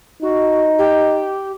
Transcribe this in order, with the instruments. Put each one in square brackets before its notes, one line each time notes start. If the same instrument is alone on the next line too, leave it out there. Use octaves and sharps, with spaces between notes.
[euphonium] D#4 [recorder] F#4
[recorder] G4